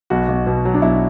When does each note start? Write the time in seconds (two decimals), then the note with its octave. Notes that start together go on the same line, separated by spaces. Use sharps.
0.10 B1 F#4
0.28 B1
0.47 B2
0.65 F#3
0.74 D4
0.82 B1 E4